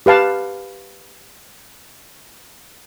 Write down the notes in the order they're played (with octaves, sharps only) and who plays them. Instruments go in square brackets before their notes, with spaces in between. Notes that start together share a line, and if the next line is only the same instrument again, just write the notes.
[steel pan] G4 B4 F5 A5